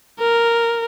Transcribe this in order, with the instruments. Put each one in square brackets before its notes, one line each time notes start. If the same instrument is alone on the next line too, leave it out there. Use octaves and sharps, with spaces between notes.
[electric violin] A#4